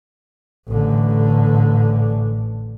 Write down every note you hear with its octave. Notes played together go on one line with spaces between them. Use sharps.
A1 D3